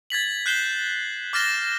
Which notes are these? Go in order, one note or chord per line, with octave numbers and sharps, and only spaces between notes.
G#6 A6 B6 F#7
F#6 G6 C7 E7 G7
D6 F6 A6 A#6 E7 G7